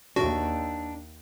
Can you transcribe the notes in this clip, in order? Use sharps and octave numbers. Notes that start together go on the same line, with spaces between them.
D#2 D4 F#4